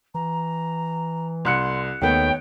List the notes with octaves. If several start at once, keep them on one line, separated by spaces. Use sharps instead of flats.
E3 A#5
C2 C6 F#6 C#7
D#2 D#3 A3 B3 C#5 G5